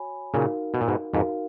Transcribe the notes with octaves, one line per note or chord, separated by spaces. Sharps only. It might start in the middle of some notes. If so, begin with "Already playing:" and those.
Already playing: F#4 C#5 G#5 B5
A#2 C#3 D#4 F#4 A#4 F5
B2
A#2
G#2 B2
F2 G#2 D#4 F#4 A#4 F5